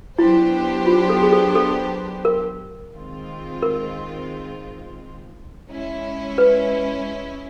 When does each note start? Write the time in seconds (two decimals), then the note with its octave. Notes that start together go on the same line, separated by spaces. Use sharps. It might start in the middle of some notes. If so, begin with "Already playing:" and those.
0.18 F#3 B3 D4 E4 G4 C5
0.86 F4
1.10 A4
1.23 G#4
1.32 A4
1.55 A4
2.25 A#4
2.93 D#3 G#3 C4 F4
3.62 A#4
5.69 G#3 C#4 E4
6.38 B4